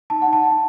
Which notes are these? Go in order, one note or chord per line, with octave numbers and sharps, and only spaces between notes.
D#4 A5
F#5
D#4
A5
D#4